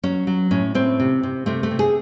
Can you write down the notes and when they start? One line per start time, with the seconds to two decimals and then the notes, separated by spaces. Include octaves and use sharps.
0.03 F#3 C#4
0.27 F#3
0.51 A2 C#4
0.75 A2 C4
1.00 C3
1.23 C3
1.46 C3 A3
1.63 A3
1.71 C3
1.79 G#4